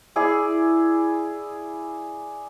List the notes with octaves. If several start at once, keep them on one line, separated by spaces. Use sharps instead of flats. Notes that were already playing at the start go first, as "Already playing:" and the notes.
E4 G#4 D5